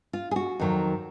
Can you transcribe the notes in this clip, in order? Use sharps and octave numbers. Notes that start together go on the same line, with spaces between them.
F4
G#4
F#4
F2 D#3 F#3